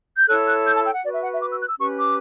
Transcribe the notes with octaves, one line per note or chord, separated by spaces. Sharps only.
G6
E4 A4 C#5 F#6
F#6
G6
A5
G5
F#5
F#4 B4 D5
E5
F#5
E5
D6
E6
F#6
E6
C#4 G4 B4 C#6
D6